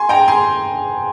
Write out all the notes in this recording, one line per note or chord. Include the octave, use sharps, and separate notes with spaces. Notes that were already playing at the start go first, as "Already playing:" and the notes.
Already playing: G#5 C6
G5 A#5
G#5 C6